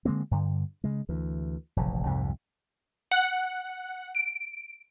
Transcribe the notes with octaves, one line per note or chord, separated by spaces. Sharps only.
D3 G#3 A#3 C4
G2 D3
C#3 G#3
D2 E3
F1 A#1 C#3 E3
C2 F2 G#2 C3
F#5
D7